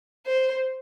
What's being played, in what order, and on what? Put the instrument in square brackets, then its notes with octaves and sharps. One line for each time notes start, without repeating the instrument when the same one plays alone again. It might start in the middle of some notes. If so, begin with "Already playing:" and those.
[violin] C5